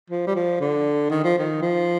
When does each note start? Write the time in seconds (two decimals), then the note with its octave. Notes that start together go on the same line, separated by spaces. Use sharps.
0.10 F3
0.27 G3
0.36 F3
0.61 D3
1.10 D#3
1.24 F3
1.38 D#3
1.62 F3